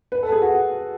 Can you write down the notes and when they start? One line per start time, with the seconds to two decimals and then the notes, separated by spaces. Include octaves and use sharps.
0.12 B4
0.23 A4
0.32 G#4
0.42 F#4